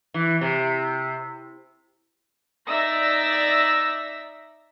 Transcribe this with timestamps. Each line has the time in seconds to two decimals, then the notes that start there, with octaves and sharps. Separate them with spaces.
0.14 E3
0.41 C3
2.70 D#4 D5 E5 E6 A#6